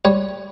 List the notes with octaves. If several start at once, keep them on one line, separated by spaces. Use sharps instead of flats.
G3 C#5